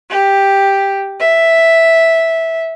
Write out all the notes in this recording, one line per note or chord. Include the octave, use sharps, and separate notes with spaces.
G4
E5